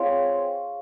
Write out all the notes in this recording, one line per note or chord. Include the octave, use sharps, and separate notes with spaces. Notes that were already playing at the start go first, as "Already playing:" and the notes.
Already playing: C4 F4 G#4 C#5